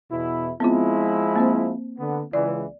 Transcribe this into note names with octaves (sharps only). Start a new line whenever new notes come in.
E2 B2 E4
F3 G#3 B3 C4 E4 F4
A#3 C4 C5
D3 B3
C#2 E3 D5